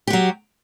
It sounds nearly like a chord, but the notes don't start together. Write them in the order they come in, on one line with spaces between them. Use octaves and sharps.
G4 F#4 F#3